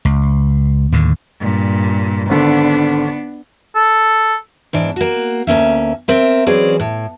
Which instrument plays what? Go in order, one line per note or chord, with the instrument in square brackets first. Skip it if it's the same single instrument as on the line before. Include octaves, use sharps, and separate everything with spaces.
[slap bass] C#2
D#2 A2 D3
[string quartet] G2 A#2
[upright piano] G#1 D3 [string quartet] B3 D4
[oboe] A4
[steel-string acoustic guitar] G#2 E3 D4
A#3 F#4
D2 A#3 C#4 E5
C4 A#4 E5
E3 F#3 C4 C#4 G#4 D5
A2